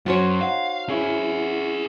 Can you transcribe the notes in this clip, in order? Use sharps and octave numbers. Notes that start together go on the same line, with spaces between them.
F#2 C#4 F#4 C5 C#5
D#4 F5 F#5
C#4 E4 G#4 B4